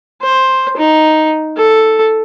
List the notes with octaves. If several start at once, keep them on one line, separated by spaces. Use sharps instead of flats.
C5
D#4
A4